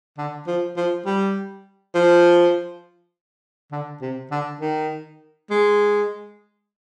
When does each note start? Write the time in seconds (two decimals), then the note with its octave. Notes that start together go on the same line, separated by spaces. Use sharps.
0.18 D3
0.48 F3
0.77 F3
1.06 G3
1.95 F3
3.72 D3
4.02 C3
4.31 D3
4.61 D#3
5.50 G#3